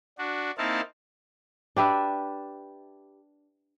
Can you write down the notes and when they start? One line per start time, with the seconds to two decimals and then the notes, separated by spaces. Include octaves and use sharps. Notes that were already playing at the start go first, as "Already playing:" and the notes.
0.18 D4 F#4
0.58 A#3 C4 D#4 E4 F5 A5
1.77 D4 G4 B4 E5